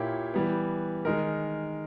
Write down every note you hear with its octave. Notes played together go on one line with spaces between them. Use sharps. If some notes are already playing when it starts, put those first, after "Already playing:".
Already playing: A#2 A#3 E4 G4 C#5
E3 G3 B3
D#3 G#3 D#4 A#4